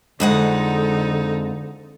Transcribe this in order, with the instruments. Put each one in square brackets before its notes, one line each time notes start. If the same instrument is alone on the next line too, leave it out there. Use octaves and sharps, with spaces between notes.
[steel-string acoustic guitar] F2 G#3 F#5 [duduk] D3 [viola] D#4 A4